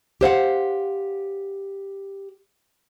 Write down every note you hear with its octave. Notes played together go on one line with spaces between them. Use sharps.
G4 C5 F5 F#5